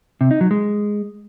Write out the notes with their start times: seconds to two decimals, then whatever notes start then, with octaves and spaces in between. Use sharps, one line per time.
0.21 C3
0.31 D#4
0.41 F#3
0.51 G#3